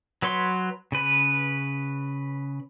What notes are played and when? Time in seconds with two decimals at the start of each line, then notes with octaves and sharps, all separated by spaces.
0.22 F#3 B4 C#5 C6
0.92 C#3 B4